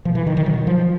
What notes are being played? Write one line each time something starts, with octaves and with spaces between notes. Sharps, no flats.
B2 F3
E3
D#3
D#3
B2 F#3
F3